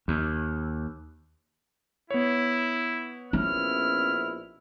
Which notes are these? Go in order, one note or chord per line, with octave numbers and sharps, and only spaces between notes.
D#2
B3 E4 C#5
A#1 B2 C#4 E4 F6